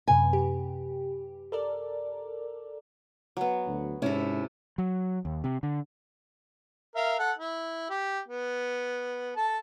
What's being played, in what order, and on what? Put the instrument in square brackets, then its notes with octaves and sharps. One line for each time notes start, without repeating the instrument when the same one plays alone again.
[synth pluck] F#2 C3 B4 [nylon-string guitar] G#5
[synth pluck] G4
A4 A#4 D5
[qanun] F#3 B3
[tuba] D2
[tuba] G#2 [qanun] C3 A4 [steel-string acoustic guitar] C#4 E4
[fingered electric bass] F#3
D#2
C3
D3
[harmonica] A#4 E5 F5
A4 F#5
E4
G4
B3
A4 A5